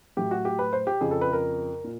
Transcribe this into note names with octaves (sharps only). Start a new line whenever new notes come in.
A2 F#3 G4
F#4
G4
B4
C5
G4
F2 C#3 F3 G#4
A4
B4
A#4
A#2